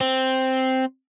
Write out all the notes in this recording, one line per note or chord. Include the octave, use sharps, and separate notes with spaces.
C4